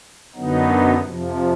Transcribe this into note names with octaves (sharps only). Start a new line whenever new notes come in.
F#2 D3 F#3 B3 D#4
F2 C3 F3